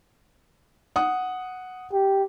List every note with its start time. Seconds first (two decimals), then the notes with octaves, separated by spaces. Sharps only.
0.96 F#5 D#6
1.93 G4